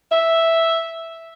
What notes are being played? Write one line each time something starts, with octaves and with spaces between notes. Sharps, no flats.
E5